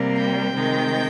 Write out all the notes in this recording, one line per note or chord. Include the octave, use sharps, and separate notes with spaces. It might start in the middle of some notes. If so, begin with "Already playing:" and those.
Already playing: C3 G3 A#3
G5
C3 D#3 G#3